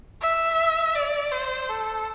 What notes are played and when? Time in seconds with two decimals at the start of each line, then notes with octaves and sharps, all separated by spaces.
0.22 E5
0.95 D5
1.32 C5
1.69 A4